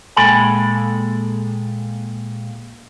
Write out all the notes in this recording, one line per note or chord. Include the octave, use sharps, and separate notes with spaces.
A#2 G#3 A4 G5 G#5 B5